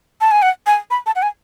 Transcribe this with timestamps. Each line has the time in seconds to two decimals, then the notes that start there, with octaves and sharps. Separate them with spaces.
0.21 A5
0.31 G#5
0.42 F#5
0.67 G#5
0.91 B5
1.06 A5
1.16 F#5
1.22 G#5